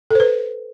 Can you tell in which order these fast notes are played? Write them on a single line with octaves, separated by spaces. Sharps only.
A4 C5 B4